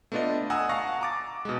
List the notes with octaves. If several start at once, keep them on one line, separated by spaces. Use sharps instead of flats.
A3 B3 D4 F4 D5 D#5
F#5 G#5 A#5 D#6 E6
F5 F#5 A5 C#6 A#6
A#5 D6 A6
B2 G#3